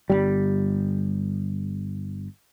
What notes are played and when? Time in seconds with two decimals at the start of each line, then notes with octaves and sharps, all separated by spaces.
0.10 G1 C#2 G3